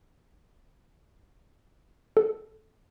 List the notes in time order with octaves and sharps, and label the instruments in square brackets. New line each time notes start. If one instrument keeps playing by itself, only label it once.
[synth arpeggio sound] A4